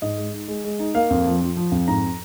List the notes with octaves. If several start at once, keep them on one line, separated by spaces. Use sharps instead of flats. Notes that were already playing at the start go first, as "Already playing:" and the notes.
G#2 D#5
G#3
D#4
G#3
G#3
D#4
A#3 F5
F2
F3
F3
F3
F2
G#2 A#5